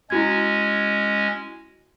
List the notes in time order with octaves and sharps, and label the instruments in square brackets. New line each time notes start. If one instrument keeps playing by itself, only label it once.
[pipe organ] G#3 C#4 [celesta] E4 F#4 G#6